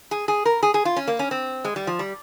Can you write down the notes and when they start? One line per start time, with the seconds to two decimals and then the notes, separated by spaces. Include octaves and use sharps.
0.11 G#4
0.28 G#4
0.45 A#4
0.63 G#4
0.74 G#4
0.85 F4
0.96 C#4
1.08 A#3
1.19 C#4
1.31 C4
1.65 G#3
1.76 G3
1.87 F3
1.99 G3